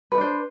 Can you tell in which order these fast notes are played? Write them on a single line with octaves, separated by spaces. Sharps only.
B4 D#4 D4 C5